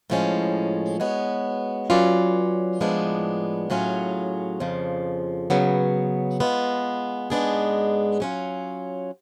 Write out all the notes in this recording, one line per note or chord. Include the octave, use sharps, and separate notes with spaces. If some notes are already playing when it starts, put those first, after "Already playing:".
A2 F3 G#3 C#4
G#3 B3 F#4 C#5
F#3 C#4 F4 B4 D5
A2 F3 G#3 B3 D4
A2 F#3 C#4 F4 G#4
F2 C#3 F3
C#3 F#3 B3
G#3 B3 F4
G#2 G#3 B3 D4 G#4
F#3 C#4 F4